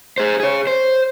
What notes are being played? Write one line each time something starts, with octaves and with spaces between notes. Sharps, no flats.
G#4 C5
G#4 C#5
C5